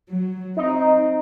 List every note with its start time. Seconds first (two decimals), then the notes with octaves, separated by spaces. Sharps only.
0.11 F#3
0.57 C4 D#4